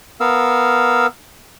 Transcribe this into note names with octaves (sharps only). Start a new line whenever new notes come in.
B3 A#4 F5 E6